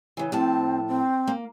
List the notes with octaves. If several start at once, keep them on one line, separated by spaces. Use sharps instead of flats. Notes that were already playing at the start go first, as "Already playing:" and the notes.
C#3 E3
A2 F3 C4 A5
C4
A#3